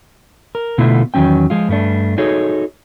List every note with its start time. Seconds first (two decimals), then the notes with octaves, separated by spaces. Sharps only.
0.55 A#4
0.78 B2 D3 A3 B3 E4 F4
1.14 E2 D#3 F#3 C#4 G5
1.50 F3 G#3 F4
1.69 G2 A3 D4
2.18 D#4 F#4 G#4 A4 C#5